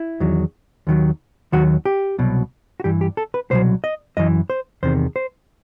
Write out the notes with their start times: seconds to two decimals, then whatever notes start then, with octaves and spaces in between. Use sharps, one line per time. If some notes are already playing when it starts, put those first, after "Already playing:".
Already playing: E4
0.20 E2 D#3 F#3
0.87 D#2 D#3 F#3
1.52 D#2 D#3 F#3 F#4
1.86 G4
2.18 C2 B2 F#3
2.80 F#4
2.84 G2 E3 G4
3.01 G4
3.17 A4
3.34 B4
3.50 C2 B2 F#3 C5
3.84 D#5
4.17 F#2 E3 D#5
4.50 C5
4.83 E2 C3 D#3 C5
5.16 C5